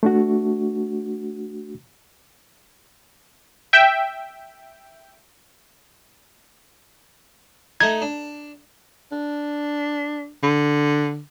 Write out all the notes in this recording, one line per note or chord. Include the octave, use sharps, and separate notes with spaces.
A3 D4 F#4
E5 G5
A3 D#4 G#6
D4
D4
D3